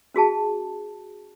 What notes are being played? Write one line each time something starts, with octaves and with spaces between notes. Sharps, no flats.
C#4 F#4 G#4 A5